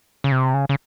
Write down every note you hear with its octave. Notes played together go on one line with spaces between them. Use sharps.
C#3
C3
C#3
C#3